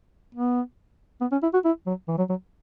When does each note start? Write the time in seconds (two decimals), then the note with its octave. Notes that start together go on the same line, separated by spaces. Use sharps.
0.35 B3
1.21 B3
1.32 C#4
1.43 E4
1.54 F#4
1.65 E4
1.87 F#3
2.08 E3
2.18 F#3
2.30 F#3